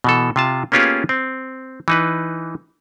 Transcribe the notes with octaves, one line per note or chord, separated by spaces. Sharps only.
B2 E3 A4
C3 F4 A5
A#3 B3 C#4 F4 G4 G#4
C4
E3 D#4 B4